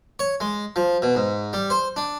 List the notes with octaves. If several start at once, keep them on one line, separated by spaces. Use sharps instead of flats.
C#5
G#3
F3
B2
G#2
G3
C5
D4